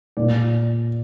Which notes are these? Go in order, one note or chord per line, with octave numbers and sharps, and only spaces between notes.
A#2 D5